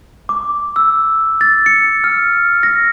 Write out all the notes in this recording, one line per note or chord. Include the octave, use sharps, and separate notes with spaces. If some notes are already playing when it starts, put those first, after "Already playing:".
D6
E6
A6
C#7
F6
A#6